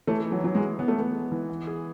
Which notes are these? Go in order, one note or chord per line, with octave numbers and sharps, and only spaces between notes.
E3 A3
D#4
F#3
F#3 D#4
G#3
G#4
E3 B3
A3
G#3 B3
G#3
E3
B3
G#4